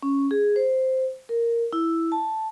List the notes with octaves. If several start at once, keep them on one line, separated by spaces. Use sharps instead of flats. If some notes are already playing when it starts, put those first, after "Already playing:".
C#4
G#4
C5
A#4
E4
A5